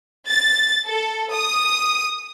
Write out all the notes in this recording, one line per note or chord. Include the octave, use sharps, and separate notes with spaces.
A6
A4
D#6